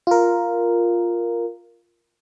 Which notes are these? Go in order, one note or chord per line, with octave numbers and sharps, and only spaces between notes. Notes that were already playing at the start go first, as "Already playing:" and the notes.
F4 A#4